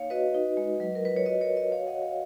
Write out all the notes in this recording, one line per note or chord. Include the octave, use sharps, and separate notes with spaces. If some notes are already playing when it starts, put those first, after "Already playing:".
Already playing: A#3 D#4 C#5 F5
F#4 B4 D#5
D#4
G#3
F#3
A#4
F4 B4
C#5
F#4 B4 D#5
A#4 C#5
F#4
B4 D#5
F#4 C#5 F5
D#5 F#5
F#4
C#5 F5